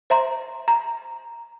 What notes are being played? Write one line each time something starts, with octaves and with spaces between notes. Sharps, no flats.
C5 E5 A#5 C6
A#5